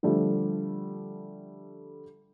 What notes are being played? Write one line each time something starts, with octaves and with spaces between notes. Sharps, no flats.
D3 F3 G3 A3